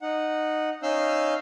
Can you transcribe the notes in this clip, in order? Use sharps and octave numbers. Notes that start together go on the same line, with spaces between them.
D#4 F#5
C#4 D#4 F5 E6 F6 G6